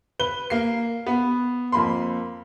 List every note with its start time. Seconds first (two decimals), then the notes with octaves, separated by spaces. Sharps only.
0.19 B4 G7
0.50 A#3 C7
1.06 B3
1.72 F2 A#3 B5 C6